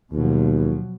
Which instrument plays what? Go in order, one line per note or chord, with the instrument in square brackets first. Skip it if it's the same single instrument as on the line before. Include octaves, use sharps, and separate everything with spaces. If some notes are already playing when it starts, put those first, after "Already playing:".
[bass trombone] D#2 [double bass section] B2 F3 F#3